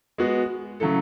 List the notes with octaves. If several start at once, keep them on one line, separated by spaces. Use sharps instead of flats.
G#3 B3 F#4
C#3 F#3 A3 E4 A4